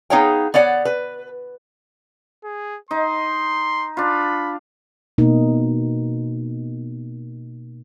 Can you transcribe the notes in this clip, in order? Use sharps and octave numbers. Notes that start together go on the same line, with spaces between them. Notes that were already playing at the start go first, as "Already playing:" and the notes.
B3 D#4 G#4 C#5 F5 G5
B3 C#5 D5 F#5
B4
G#4
D#4 C6
D4 F4 B5
B2 A#3 D#4